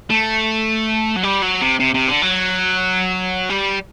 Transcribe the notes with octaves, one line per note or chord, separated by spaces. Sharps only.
A3
F#3
G3
F#3
C3
C3
C3
D3
F#3
G3